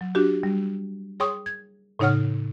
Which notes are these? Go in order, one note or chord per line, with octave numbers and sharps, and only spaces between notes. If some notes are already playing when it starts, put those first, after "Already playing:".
F#3
D4 F#4 G4
G3
G#4 C#5 G5 C6 C#6 D#6
G#6
A2 C#3 D#4 C#5 F#5 F6